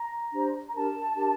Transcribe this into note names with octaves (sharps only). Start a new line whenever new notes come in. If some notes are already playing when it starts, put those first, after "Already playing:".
Already playing: A#5
D4 G4 C5
A#5
D4 G4 A#4 A5
D4 G4 A#4